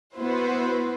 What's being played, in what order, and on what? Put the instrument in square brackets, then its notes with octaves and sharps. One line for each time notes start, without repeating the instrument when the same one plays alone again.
[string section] B3 E4 F#4 B4 C5